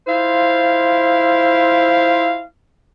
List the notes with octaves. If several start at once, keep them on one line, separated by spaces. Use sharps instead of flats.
E4 F4 C5 F5